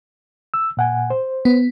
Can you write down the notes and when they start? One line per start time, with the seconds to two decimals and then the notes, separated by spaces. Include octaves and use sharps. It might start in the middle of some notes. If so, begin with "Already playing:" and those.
0.54 E6
0.77 A#2 F#5 G#5
1.10 C5
1.45 B3